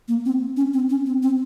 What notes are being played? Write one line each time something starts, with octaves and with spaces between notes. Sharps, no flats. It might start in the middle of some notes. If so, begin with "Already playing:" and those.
A#3
C4
C#4
C4
C#4
C4
C4